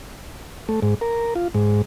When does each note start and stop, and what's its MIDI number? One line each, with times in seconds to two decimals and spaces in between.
0.69 0.80 57
0.83 0.95 44
1.01 1.34 70
1.36 1.48 65
1.54 1.82 44